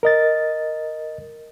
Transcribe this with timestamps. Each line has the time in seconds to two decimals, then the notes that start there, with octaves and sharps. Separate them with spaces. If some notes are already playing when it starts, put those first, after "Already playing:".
0.03 A#4 D#5 A6